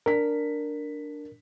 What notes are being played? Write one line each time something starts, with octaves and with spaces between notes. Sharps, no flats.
D4 A#4 B6